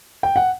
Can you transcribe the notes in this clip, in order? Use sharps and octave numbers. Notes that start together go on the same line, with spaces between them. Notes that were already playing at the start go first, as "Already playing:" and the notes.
G5
F#5